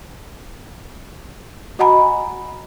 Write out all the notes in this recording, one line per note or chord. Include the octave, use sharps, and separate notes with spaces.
F#4 D#5 F#5 G#5 A#5 B5